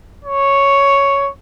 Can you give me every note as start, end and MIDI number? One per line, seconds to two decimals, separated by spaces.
0.25 1.30 73